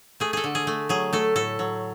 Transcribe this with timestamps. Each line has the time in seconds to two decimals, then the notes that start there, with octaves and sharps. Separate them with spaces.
0.20 A3 G#4
0.33 G#4 A4
0.44 D3
0.55 G#4
0.67 A3
0.89 F#3 G#4
1.13 A3 A4
1.36 A2 A4
1.59 F#3